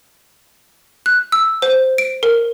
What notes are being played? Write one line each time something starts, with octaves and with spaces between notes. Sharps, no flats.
F#6
E6
C5
D7
A#4